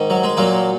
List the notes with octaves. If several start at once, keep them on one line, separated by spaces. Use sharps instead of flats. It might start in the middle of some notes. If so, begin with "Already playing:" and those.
Already playing: G#2 D#3
F#3
G#3
A#2 F#3 A#3